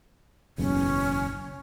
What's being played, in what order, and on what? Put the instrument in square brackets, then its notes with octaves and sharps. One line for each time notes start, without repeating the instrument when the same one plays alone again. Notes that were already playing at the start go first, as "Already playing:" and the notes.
[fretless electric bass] F#1 B1 E2 [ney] C#4